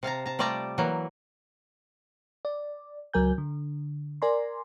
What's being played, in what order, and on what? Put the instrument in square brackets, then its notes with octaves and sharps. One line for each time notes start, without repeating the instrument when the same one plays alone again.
[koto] C3 F5 A5 A#5
A5 A#5
G3 A3 F4 D5 A5 A#5
E3 F#3 A#3
[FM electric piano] D5
C#2 F#3 A#4 G#5 G6
D3
A#4 D5 G#5 A#5 C6